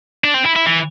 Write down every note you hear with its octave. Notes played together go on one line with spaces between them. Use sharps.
D4
C4
E4
E4
E3